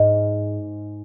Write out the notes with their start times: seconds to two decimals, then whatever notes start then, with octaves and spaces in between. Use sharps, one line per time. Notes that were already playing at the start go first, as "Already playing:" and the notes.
Already playing: G#2